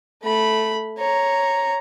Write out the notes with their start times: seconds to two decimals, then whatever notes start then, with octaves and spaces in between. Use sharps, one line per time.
0.23 A3 B5
0.98 C#5 A#5